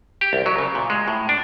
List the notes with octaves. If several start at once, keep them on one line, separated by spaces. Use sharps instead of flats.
G4
C2
F#3
C#3
A#2
G#3
A2
D4